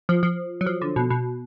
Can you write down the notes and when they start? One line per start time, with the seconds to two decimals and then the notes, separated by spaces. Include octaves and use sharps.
0.09 F3
0.23 F3
0.61 F#3
0.66 F3
0.81 D3
0.96 B2
1.10 B2